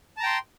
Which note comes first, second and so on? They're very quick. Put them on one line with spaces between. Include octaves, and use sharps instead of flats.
A5 A#5 G5 C6